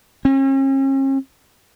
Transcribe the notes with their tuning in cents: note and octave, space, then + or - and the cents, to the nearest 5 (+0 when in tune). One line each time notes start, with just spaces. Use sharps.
C#4 -40